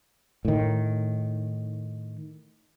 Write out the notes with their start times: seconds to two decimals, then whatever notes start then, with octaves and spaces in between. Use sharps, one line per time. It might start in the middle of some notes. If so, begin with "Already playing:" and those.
0.45 A2 D#3